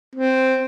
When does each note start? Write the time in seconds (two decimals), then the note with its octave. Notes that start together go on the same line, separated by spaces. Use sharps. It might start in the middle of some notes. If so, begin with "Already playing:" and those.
0.15 C4